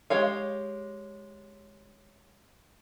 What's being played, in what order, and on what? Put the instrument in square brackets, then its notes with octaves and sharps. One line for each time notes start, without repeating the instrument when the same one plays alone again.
[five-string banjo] G#3 G4 C#5 F5